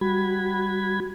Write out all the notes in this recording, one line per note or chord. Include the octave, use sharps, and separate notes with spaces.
G3 F#4 B5 G#6